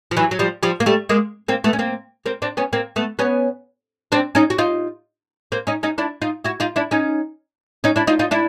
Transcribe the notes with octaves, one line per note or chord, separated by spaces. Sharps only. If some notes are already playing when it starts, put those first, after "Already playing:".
F3
E3 F#3
F#3
F3 G3
F3 G3
A#3
G3 A3
G#3 A#3
A#3 C4
A3 B3
C#4
A#3 C4
A#3 C4
C4 D4
B3 C#4
A#3 C4
A3 B3
B3 C#4
C4 D4
C#4 D#4
F#4
D#4 F4
A#3 C4
C#4 D#4
C#4 D#4
D4 E4
D#4 F4
E4 F#4
D#4 F4
D4 E4
C#4 D#4
C#4 D#4
D4 E4
D#4 F4
D#4 F4
D4 E4